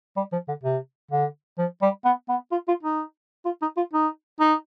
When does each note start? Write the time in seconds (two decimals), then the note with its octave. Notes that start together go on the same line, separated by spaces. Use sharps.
0.17 G3
0.32 F3
0.48 D3
0.64 C3
1.11 D3
1.58 F3
1.82 G3
2.05 B3
2.29 B3
2.52 F4
2.68 F4
2.83 D#4
3.45 F4
3.62 D#4
3.77 F4
3.93 D#4
4.40 D#4